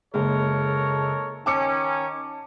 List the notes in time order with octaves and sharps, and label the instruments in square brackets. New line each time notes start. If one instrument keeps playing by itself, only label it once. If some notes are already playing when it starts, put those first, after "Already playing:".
[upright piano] F#1 G#3 [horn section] A4 A#4 C#5
[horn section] D#3 C#4 [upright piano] A5 D6 C#7